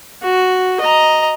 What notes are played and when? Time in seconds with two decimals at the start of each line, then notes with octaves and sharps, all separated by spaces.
0.23 F#4
0.80 D#5 A#5